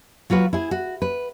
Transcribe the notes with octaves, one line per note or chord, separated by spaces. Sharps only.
F#3 F4 F#4 B4
E4 G#4
F#4
B4